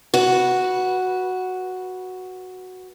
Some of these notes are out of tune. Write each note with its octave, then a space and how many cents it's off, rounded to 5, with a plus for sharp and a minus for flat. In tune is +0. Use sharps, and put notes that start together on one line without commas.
F#4 +0 B4 -20